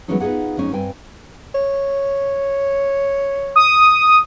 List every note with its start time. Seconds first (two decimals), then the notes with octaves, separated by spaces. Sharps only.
0.08 E3 F#3 G#3 B3 C#4 D#4
0.20 B3 D#4 F4 G#4 F#5
0.57 F2 G#3 C#4 D#4
0.72 G2 C4 G5 G#5
1.55 C#5
3.56 D#6